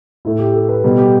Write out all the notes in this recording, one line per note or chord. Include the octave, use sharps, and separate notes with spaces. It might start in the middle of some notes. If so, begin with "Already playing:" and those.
A2 A3 E4
G4
A4
B4
B2 G3 A4
G4